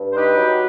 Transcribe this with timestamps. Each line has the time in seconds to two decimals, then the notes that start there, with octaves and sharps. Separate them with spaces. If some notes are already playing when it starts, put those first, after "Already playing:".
Already playing: G2
0.11 C5
0.16 D#4 G4 B4
0.36 F#3